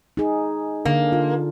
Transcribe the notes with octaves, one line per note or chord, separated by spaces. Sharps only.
D#4 G#4
D3 A#3 D4
F4